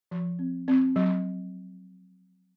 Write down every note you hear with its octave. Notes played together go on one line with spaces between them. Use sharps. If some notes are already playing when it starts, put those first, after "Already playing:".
F3
C4
C4
F#3